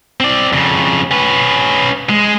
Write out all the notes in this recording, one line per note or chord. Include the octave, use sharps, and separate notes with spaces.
C4 D5
F2 C#3
C#4 B4
G#3